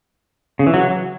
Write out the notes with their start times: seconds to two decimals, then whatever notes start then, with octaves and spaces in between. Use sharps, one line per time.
0.59 C#3
0.67 E3
0.74 F#3